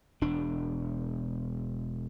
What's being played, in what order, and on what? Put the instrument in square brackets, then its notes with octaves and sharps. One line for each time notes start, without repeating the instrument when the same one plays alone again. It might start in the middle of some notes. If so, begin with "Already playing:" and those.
[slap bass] E1 D4